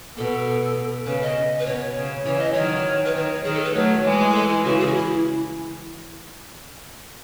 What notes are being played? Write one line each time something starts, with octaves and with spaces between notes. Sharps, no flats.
B2 A4
C#3 B4
D#5
B4
B2 C#5
C#3
C#3 E3 C#5
D#5
D#3 F#3 C#5
B4
D#3 C#5
D#3 G#4
A4
B4
F#3 A3 C#5
E3 G#3
B4
A4
E4
C#3 E3 F#4
G#4
F#4
E4